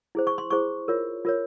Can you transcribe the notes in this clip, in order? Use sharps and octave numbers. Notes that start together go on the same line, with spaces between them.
E4 G#4 C5
C#6
C6
E4 G#4 C5 C#6
F4 A#4 C#5
F4 A#4 C#5